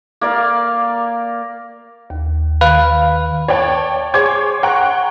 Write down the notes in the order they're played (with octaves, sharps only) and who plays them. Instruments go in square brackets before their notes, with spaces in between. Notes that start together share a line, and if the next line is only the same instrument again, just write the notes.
[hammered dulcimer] A#3 D5 F5
[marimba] D#2
[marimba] D#3 [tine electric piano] B4 [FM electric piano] F5
[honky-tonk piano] C#5 D5 G5 A5
G#4 C5 C#5 C#6 D6 G#6
F#5 G5 A#5 C#6 F#6